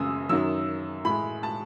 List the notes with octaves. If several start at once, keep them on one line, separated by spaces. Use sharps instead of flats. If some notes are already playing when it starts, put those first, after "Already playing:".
Already playing: F#2 C#3 G#3 D#6 E6
F#2 D#3 F#3 E6
A2 G#3 B5
A5